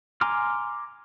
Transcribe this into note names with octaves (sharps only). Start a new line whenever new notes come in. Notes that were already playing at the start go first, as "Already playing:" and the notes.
G#5 A#5 C6 D6 F6